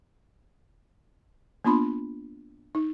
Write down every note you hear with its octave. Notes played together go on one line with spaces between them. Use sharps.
A#3 B3 D4 F4 B5 C6
D#4